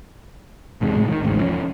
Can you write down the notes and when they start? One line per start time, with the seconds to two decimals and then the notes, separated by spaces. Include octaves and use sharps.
0.81 E1 G#2 C3 G#3
0.95 F1 D2 A2 G#3
1.08 D#3 F3
1.22 E1 A1 D2 G#2
1.39 E1 F3 C#4